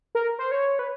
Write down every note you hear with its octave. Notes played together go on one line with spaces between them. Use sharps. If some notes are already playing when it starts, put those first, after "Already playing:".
A#4
C5
C#5
B4